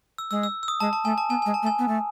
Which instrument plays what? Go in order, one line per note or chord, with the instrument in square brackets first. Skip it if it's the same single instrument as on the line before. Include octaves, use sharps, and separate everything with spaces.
[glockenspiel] E6
[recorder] G#3 [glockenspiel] E6
[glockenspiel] E6
E6
D#6
[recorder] G#3 [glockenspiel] A5
[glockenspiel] A5
[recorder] A3 [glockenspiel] G#5
[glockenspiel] A5
[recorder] B3 [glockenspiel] G#5
[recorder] G#3 [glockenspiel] G#5
[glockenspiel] A5
[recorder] A3
[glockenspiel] G#5
[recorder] B3
A3